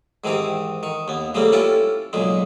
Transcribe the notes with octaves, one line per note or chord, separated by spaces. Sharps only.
G#2 D#3 E3 C4 G4
D#3 C#6
D#2 B3
C#3 G3 A3 A#3 C4
C#4 E4 F4 G4 A4
B1 A#2 C#3 G#3